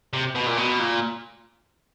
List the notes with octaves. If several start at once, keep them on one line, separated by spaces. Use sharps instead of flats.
C3
B2
A#2
B2
A#2